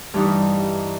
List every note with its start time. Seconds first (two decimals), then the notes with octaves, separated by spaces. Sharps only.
0.14 G2 E3 G3 D#4